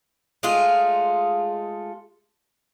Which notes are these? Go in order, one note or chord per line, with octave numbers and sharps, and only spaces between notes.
G#3 A3 F4 G#4